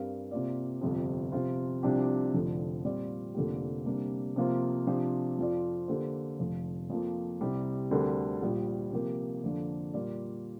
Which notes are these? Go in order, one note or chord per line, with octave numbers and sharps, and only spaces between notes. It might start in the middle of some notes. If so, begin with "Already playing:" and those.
Already playing: G2 G3 C4 A#4 F5
C3 A#3 F4 D5
G1 F2 C3
C3 F3 C4 F4 C5
C2 C3 F3 D4 G4
F1 F2 D3 F3
A#2 G3 C4 F4 D5
F1 F2 D3 A#3 G4
C3 G3 A#3 D4
C3 F3 A#3 F4 C5
C3 F3 D4 G4 C5
F2 F3 C4 F4 D5
D3 A#3 G4 C5
F1 F2 F3
F2 F3 A#3
C2 C3 G3
D2 D3 G3 C4 A#4
A#1 A#2 G3
C3 F3 A#3 G4 A#4
F2 D3 F3 A#3 D4
A#2 G3 A#3 F4 D5